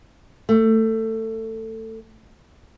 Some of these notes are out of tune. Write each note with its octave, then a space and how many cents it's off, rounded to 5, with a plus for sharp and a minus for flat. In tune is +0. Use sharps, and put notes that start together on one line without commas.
A3 +20